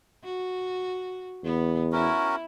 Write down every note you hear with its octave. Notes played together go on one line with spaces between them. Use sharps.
F#4
E2 B3
C#4 E4 F#4 A#4